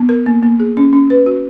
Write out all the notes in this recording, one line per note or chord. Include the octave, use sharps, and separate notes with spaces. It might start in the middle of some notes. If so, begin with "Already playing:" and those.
Already playing: B3
A#4
A#3
A#3
G#4
C#4
C#4
B4
F#4